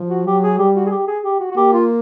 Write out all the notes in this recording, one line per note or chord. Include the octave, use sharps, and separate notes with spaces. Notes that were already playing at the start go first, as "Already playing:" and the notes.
Already playing: F3
F#4
F#3 G4
G#4
G3 G4
F#4
G#4
G4
G#4
G4
F#4
F#4
A#3 G4
F4